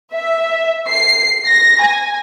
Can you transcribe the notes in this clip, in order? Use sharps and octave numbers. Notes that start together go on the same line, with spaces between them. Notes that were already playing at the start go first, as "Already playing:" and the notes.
E5
C7
A#6
G#5